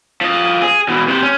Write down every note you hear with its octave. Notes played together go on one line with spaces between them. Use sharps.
F3 D#5
G#4
B2 E3
C3 C5
C#4